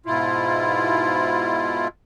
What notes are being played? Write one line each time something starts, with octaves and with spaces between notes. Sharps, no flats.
G#2 B2 E4 F4